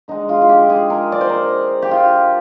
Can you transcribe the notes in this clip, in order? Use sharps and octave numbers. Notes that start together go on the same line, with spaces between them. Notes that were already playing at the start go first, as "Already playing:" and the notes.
D3 G#3 D#4
F4
F4
G4
G#4
A#4
D5
C5
A#4
G4
F4